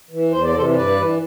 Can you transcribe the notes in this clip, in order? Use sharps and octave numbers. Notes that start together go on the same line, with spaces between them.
E3
E2 C5
D5
C3 E3 A4 C5
G2 B4 D5
E3